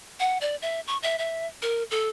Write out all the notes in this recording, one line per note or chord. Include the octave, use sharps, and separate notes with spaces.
F#5
D5
E5
C#6
E5
E5
A#4
A4